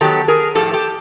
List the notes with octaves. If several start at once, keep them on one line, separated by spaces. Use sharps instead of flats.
D#3 F#3 B3 G4 A4
G#4 A#4
A2 F3 A3 G4 A4
G4 A4